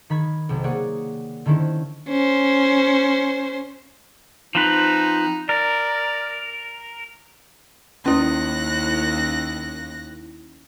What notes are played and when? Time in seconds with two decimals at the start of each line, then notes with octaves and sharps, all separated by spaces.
0.10 D#3 B5 G#6
0.49 B1 C3
0.64 A#3 G#4 C#5 D5 F#5
1.46 D3 D#3 C#4 E4 C5
2.09 C#4 C5
4.55 F3 C4 D#4 B4
5.49 A#4 D5
8.06 D#2 C#4 E4 F#6 A#6